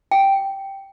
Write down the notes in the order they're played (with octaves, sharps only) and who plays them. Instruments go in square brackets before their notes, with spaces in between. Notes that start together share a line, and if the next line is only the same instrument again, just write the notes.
[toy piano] G5